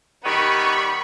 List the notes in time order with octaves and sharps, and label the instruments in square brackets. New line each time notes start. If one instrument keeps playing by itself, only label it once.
[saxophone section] D#3 G3 B3 [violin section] B5 C#6